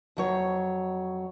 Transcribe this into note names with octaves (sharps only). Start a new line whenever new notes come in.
F2 F#3 C#5